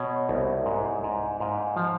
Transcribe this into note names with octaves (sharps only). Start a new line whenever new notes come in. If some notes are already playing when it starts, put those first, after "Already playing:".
Already playing: B2 C#5
C2
G#2
G#2
G#2 F5
F3